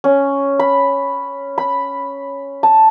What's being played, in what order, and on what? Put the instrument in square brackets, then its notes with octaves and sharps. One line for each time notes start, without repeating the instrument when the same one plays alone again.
[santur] C#4
B5
B5
A5